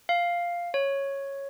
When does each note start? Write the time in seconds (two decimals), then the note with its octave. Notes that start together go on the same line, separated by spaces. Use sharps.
0.09 F5
0.74 C#5